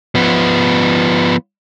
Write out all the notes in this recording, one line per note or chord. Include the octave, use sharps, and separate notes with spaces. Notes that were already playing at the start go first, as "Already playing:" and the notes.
F3 B3